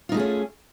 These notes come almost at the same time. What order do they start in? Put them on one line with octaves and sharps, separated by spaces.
F4 D#4 A3 G#4 C#4